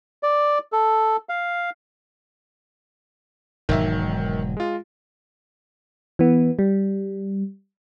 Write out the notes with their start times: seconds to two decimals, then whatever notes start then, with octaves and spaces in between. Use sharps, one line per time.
0.23 D5
0.72 A4
1.29 F5
3.69 E1 G#2 D#3 F#3 E5
4.57 G#3 F4
6.19 E3 B3
6.59 G3